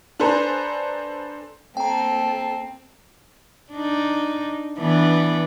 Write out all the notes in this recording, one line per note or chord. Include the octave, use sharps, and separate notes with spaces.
D4 A4 B4 C5 G#5 A#5
A#3 C4 A4 G5 A#5
D4 D#4
E3 B3 D4